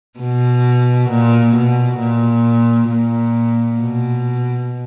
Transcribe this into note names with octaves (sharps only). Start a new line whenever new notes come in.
B2
A#2
B2
A#2
A#2
B2